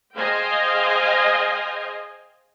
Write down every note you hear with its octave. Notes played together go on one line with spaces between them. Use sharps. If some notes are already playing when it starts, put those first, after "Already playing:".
G#4 C5 D#5 F5 G5 G#5